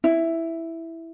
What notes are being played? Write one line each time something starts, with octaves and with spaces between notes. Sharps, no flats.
E4